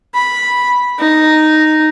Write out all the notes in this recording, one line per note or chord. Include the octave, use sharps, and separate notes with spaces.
B5
D#4